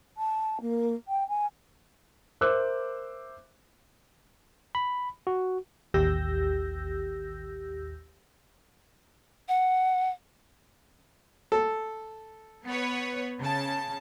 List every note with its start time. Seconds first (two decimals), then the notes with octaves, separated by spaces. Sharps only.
0.17 A5
0.61 A#3
1.08 G5
1.29 G#5
2.41 A#4 C5 E5 D6 E6 F#6
4.75 B5
5.27 F#4
5.94 A1 D#2 G4 E6 G6 A#6
9.49 F#5
11.52 A4
12.66 B3 B4 C#5
13.41 C#3 A5